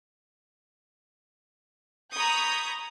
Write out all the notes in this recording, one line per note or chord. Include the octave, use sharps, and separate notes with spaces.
A#5 B5 C#6 D#6 G6 G#6